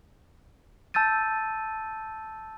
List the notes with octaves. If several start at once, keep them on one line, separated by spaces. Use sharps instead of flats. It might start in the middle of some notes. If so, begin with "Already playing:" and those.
A5 E6 G6 A6 D#7